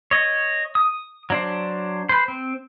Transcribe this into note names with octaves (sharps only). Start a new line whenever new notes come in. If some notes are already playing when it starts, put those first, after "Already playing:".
C#5 D#5
D#6
F#3 D4 C5
B4 C5
C4